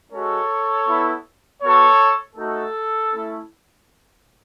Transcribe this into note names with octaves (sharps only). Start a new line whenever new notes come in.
G#3 C#4 F#4 A4 C#5
B3 E4
B3 F#4 A4 C#5
A3 D#4 F#4 A4
A3 C#4 E4